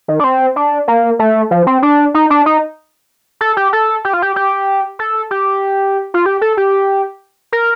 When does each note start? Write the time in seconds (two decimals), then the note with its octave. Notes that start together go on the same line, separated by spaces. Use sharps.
0.08 D#3
0.20 D4
0.24 C4
0.56 D4
0.88 A#3
1.19 A3
1.51 F3
1.67 C4
1.83 D4
2.14 D#4
2.30 D4
2.46 D#4
3.41 A4
3.57 G4
3.73 A4
4.05 G4
4.13 F4
4.22 G4
4.36 G4
4.99 A4
5.31 G4
6.14 F4
6.26 G4
6.41 A4
6.57 G4
7.52 A#4